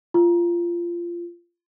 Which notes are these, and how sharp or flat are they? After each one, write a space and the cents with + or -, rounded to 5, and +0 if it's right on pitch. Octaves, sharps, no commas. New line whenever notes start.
F4 -20